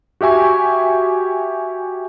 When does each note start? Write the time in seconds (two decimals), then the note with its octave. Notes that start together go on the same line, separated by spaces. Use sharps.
0.21 F#4 G4 E5 G#5 C#6